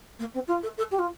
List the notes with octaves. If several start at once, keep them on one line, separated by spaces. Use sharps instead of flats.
A#3
C4
F4
A4
A4
G4
F4